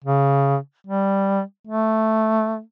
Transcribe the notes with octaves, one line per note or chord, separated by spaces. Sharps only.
C#3
G3
A3